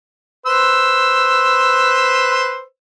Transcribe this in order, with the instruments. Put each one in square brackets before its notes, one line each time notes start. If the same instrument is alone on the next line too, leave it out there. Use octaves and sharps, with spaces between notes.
[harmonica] B4 C5 E6